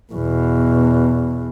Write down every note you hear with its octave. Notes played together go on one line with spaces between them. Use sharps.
E2 B2